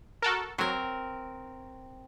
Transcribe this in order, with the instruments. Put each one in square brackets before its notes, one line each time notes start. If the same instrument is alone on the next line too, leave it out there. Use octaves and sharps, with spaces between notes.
[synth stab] F#4 A4 A#4
[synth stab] F#3 [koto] C4 A#4